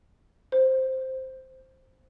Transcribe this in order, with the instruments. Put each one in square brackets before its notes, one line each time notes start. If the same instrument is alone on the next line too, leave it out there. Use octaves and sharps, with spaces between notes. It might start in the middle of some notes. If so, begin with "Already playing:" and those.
[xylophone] C5